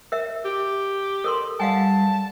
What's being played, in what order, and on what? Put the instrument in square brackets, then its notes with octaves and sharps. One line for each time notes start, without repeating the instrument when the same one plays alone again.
[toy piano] A#4 E5
[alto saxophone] G4
[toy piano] A4 A#4 C6
[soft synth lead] G3 [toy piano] F5 F#5 G#5 [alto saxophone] A5